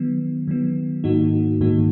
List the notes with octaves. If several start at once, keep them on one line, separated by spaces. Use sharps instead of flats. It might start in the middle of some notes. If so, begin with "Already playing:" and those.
Already playing: D#3 F#3 B3
D#3 F#3 B3
G#2 D#3 A#3 D#4 F#4
G#2 D#3 A#3 D#4 F#4